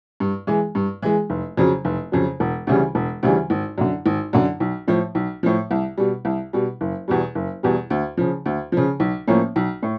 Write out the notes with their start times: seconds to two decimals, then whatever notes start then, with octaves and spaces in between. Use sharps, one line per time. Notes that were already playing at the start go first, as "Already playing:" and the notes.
0.20 G2
0.47 E3 G#3
0.75 G2
1.02 E3 G#3
1.30 F1
1.57 F2 C#3 F#3
1.85 F1
2.12 F2 C#3 F#3
2.40 E1
2.67 D2 C#3 E3 G3
2.95 E1
3.23 D2 C#3 E3 G3
3.50 G#1
3.78 F#2 D3
4.06 G#1
4.33 F#2 D3
4.60 B1
4.88 A2 F3
5.15 B1
5.43 A2 F3
5.71 C2
5.98 B2 G3
6.25 C2
6.53 B2 G3
6.81 F#1
7.08 E2 B2 G3
7.35 F#1
7.63 E2 B2 G3
7.90 D2
8.17 C#3 F3
8.46 D2
8.72 C#3 F3
9.00 B1
9.28 A2 F3 A#3 C#4
9.56 B1
9.83 A2